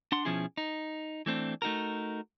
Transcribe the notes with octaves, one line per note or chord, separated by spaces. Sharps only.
D4 F#5 C6
B2 F3 C#4 E4 G#4
D#4
E3 A3 C4 D4
A3 D#4 F#4 A#4